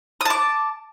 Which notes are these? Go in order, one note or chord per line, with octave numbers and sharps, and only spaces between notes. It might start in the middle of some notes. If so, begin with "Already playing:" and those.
A5 D6 D#6